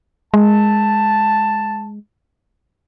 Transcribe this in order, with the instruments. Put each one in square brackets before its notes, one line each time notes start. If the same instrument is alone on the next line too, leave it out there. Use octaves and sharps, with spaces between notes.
[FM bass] G#3 [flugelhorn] A5